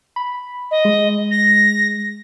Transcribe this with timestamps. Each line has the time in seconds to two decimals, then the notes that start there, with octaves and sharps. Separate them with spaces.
0.16 B5
0.71 D#5
0.85 G#3
1.31 A#6